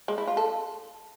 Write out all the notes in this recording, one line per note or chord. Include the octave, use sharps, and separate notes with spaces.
G#3
E4
F4
A4